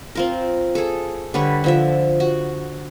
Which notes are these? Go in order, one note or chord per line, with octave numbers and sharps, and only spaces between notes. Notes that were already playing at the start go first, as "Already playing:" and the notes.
C4 F4 A#4
G#4 A4
D3 G3 B4 C#5
D3 F3 E5
F#4